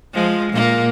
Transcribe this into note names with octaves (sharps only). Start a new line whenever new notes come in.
F3 G#3
A#2 A#3